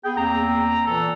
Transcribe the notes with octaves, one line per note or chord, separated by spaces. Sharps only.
B3 G#4 G5
E2 A#3 C4 A#5
A#2 E3 A4